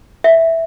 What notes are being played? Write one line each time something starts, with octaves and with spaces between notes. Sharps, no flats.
E5